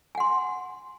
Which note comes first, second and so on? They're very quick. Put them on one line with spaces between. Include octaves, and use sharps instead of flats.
G#5 F#5 C6